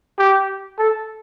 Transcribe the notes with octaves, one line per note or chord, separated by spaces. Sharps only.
G4
A4